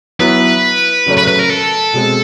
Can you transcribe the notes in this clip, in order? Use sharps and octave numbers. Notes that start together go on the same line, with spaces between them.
F#3 B3 E4 B4
C#3 F#3 A3 C#4
B4
B4
A#4
A4
B2 G#3 C4